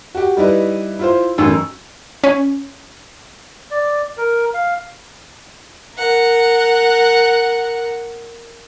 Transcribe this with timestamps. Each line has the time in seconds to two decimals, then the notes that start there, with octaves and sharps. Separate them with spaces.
0.15 F#4 G4
0.37 G3 D#4 E4 B4
0.99 E4 F4 C5
1.38 A1 F#2 E6
2.24 C#4
3.71 D5
4.17 A#4
4.54 F5
5.95 A#4 F#5